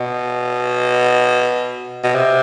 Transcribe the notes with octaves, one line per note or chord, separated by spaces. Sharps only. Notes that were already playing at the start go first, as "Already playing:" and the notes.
Already playing: B2
B2
C3